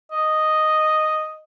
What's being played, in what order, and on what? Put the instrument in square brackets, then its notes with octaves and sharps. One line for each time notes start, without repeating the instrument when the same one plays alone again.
[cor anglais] D#5